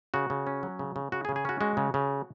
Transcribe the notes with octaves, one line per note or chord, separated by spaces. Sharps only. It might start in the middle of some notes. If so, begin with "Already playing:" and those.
C#3 F#4
C#3
C#4
F#3
C#3
C#3
C#3 F#4
G#4
C#3
G#4
C#4 F#4
G#3 F#4
C#3
C#3